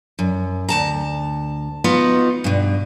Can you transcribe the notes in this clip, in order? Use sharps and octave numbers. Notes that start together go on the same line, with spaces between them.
F#2
D2 A5 A#5
B3 D#4 F4 F#4
G2 B2